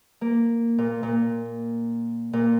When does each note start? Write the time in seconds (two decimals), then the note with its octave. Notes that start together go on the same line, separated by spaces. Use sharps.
0.21 A#3
0.78 A#2
1.03 A#2
2.33 A#2